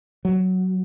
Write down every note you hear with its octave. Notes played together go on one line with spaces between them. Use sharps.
F#3